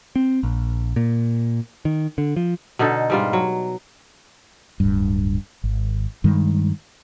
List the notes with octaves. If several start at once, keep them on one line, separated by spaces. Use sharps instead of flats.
C4
A#1
A#2
D#3
D3
F3
B2 D3 D#4 A4
G#2 G3 F4
F#3
D1 G2
G#1
G2 D#3 G#3